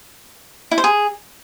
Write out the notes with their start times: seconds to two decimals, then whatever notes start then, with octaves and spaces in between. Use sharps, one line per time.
0.71 E4
0.78 C5
0.84 G#4